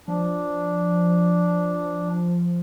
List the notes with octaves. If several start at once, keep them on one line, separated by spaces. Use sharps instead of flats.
F3 D4